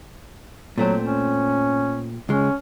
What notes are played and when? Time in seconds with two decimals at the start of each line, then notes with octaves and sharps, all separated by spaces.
0.78 A#2 F#3 A3 C4
1.04 C#4
2.29 C#2 G#3 C#4